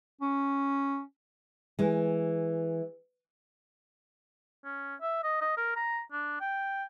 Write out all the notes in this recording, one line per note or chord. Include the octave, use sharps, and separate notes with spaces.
C#4
E3 G#3
C#4
E5
D#5
D#5
A#4
A#5
D4
G5